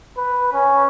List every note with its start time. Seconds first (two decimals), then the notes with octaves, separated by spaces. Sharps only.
0.17 B4
0.53 C#4